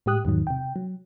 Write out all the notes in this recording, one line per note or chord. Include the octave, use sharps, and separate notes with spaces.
A2 G#3 G4 D#6 F#6
E2 G#2 D#3 F#3
C3 G5
F#3